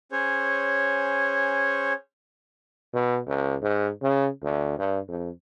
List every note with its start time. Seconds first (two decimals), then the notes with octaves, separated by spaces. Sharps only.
0.12 C#4 G#4 C5 C#5
2.94 B2
3.27 C#2
3.62 G#2
4.02 C#3
4.43 D2
4.78 G2
5.08 F2